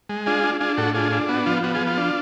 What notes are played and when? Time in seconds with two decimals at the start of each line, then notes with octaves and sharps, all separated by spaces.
0.09 G#3
0.26 D4 F4 G#4
0.44 D4
0.60 D4 F4 G#4
0.77 A2 F#4 A4
0.94 D4 F4 G#4
1.12 D4
1.29 B3 F#4
1.46 F3 F4
1.63 B3 F#4
1.75 F4 G#4
1.81 F3
1.87 F4
1.98 D4